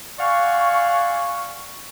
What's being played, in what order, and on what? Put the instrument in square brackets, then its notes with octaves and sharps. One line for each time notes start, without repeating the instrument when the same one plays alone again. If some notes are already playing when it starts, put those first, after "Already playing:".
[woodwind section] D5 F5 F#5 G#5 C#6